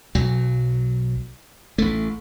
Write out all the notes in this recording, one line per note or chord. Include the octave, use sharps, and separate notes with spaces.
B1 F#3
A1 A3